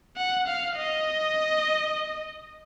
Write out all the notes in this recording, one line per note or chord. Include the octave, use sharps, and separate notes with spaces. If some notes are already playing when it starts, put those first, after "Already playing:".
F#5
F5
D#5